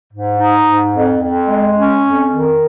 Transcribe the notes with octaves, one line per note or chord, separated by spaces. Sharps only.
G#2
D#4
G#2
F2
F2
G#3
C#4
F2
D#3